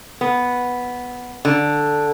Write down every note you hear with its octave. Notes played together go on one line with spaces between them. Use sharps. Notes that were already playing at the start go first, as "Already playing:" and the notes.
B3
D3